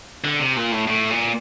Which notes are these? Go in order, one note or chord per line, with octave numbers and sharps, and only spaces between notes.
D3
C3
A#2
A2
A2
A#2